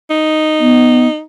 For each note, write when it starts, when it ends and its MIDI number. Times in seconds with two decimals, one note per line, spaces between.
0.11 1.22 63
0.60 1.07 59